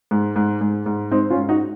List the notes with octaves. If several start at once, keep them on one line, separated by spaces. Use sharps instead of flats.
G#2
G#2
G#2
G#2
G#2 C4 D#4
C#4 F4
G#2
D#4 F#4